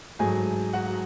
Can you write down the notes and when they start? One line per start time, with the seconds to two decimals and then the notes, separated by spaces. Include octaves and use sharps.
0.19 G#2 F#3 A3 G#4 G#5
0.73 F#4 F#5